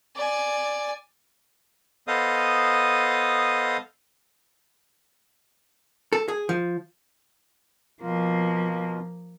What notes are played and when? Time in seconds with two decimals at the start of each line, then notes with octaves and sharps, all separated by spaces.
0.16 D5 G#5
2.08 B3 A4 C5 D#5 F5 D#6
6.13 A4
6.28 G#4
6.49 F3
8.02 B2 F3 A#3 F4